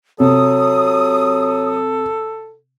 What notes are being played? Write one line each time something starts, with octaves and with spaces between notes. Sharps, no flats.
C3 F#3 A4 D#6